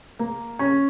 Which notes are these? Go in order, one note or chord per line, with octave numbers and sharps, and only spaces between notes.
A#3
C#4